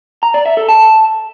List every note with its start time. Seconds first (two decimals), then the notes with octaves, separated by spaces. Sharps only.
0.23 A#5
0.34 D5
0.46 E5
0.57 A4
0.68 A5